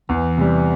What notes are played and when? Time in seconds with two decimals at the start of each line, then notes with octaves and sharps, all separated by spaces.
0.09 E2 E3
0.37 C3 G3